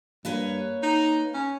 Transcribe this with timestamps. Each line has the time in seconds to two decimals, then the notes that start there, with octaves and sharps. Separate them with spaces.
0.25 G2 A#3 B4 C#5
0.83 D#4
1.34 C#4